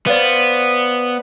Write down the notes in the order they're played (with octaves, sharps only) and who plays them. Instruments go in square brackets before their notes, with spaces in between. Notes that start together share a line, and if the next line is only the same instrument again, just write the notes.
[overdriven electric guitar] B3 [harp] C5 D5 F5